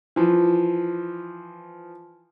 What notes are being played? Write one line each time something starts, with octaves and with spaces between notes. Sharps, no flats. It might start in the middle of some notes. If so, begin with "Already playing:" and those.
E3 F3